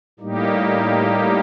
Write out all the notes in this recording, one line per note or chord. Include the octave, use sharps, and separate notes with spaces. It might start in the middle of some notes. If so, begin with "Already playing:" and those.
A2 G3 A#3 D#4 G4